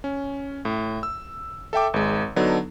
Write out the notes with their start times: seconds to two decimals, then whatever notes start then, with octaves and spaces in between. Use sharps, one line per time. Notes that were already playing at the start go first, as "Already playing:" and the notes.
0.04 C#4
0.65 A2
1.03 E6
1.73 A4 E5 G5 D6
1.94 G#1 G#3
2.36 D3 F#3 B3 D4 D#4 A4